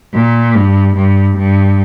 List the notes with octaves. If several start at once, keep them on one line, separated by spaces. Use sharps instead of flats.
A#2
G2
G2
G2